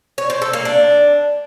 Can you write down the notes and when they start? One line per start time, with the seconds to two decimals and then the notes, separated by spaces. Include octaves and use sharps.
0.18 C#5
0.30 C5
0.42 A4
0.53 A#3
0.65 D4